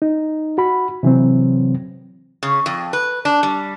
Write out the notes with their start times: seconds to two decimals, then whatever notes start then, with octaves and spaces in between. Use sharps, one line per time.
0.02 D#4
0.58 F#4 B5
1.03 C3 E3 F#3 C4
2.43 C#3
2.66 F2
2.93 B4
3.25 D4
3.43 G3